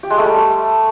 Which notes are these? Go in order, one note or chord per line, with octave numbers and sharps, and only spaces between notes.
G4
G#3
A3
G3